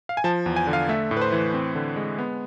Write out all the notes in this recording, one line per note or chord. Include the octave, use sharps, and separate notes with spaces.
F5
G#5
F3 A5
E2
G#5
D3
F5
A3 E5
A2
B4
C5
E3
C4
D3
G#3
B3